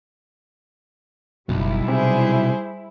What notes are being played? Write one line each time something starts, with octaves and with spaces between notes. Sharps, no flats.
F#1 B1 G3 E4
C3 G#4 C5